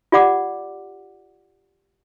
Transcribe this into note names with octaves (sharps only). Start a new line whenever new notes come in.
F4 G4 D5 F#5 D6